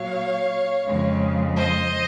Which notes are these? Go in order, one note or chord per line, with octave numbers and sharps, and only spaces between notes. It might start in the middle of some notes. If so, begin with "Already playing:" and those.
Already playing: A#2 F#3 C#5 F5
F2 C#3 G#3
C5 D#5